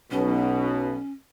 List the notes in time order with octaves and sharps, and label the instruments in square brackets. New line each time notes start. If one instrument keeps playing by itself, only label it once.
[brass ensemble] B1 B2 [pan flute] C#4